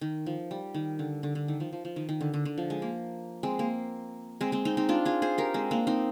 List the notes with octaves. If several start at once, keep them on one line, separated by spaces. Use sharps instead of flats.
D#3
F3
G3
D#3
D3
D3
D3
D#3
F3
F3
F3
D#3
D#3
D3
D3
D3
F3
G#3
A#3
G#3 C4
A#3
G#3 C4
G#3 C4
C4 D#4
C4 D#4
D4 F4
F4 G#4
G#4 C5
G4 A#4
G#3 C4
A#3 D4
C4 D#4